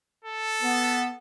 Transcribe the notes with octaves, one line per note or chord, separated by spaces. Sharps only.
A4
B3